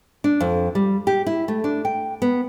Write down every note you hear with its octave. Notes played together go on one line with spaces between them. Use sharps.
D4
F2
G3
G4
E4
A3
D4
G5
B3